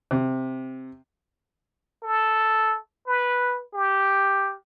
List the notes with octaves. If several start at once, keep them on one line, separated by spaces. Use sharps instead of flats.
C3
A4
B4
G4